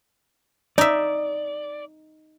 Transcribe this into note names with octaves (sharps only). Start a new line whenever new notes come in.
D#4 D5 E5